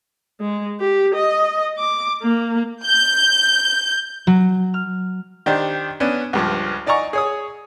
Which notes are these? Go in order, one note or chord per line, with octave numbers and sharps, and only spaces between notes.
G#3
G4
D#5
D6
A#3
G6
F#3
F6
D#3 D4 G4 C5
B3 C#4 D4
C#2 G2 F3
D#4 D5 G#5 A#5 C#6
G#4 C#5 D#6